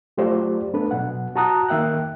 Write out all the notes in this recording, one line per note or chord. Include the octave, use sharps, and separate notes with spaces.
F#3 A3 F4 G4 C5 D5
A3 B3 D4 A4 B4
B2 F#3 B3 F#5
F#4 A5 A#5 D#6 F#6
D#3 A#3 E5 G5 F#6